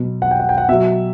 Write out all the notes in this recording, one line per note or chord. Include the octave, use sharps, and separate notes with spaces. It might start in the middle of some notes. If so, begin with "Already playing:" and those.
Already playing: B2 F#3
F#5
G5
F#5
G5
F#5
B2 F#3 E5